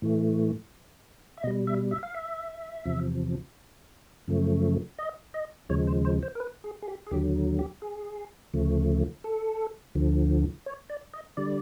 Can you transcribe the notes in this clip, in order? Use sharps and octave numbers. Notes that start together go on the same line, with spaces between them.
A2 E3 A3
E5
B2 G3 D#5
E5
E5
F5
E5
E2 C3 F3
F#2 C#3 F3 A3
D#5
D#5
D#2 C#3 F3 G#3 C#5
C5
C5
C5
A#4
B4
G#4
G#4
G4
G#4
D#2 D3 F#3 G4
G4
G#4
D2 C#3 F3 A3
A4
D2 D3 F3
C#5
D5
D#5
D3 G3 D5